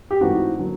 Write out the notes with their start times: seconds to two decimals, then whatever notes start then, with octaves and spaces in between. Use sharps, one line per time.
0.11 G4
0.21 G#2 E3 A3 C4 D#4 F#4
0.59 D3 F#3 A#3